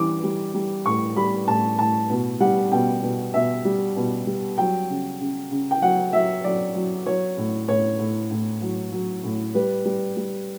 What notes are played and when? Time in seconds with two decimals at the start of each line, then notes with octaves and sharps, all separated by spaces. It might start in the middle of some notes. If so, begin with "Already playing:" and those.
Already playing: E3 G3 D6
0.24 G3
0.54 G3
0.85 A2 C#6
1.16 G3 B5
1.48 A2 A5
1.79 A2 A5
2.10 B2
2.40 G3 F#5
2.72 B2 G5
3.02 B2
3.34 B2 E5
3.65 G3
3.96 B2
4.27 G3
4.58 F#3 G5
4.89 C#3
5.20 C#3
5.51 C#3
5.71 G5
5.82 F#3 F#5
6.13 F#3 E5
6.44 F#3 D5
6.75 F#3
7.06 F#3 C#5
7.37 A2
7.68 A2 C#5
7.99 A2
8.31 A2
8.62 F#3
8.92 F#3
9.24 A2
9.55 G3 B4
9.85 G3
10.17 G3